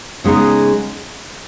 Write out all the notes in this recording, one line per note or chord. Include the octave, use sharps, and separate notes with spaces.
C#3 G#3 B3 D#4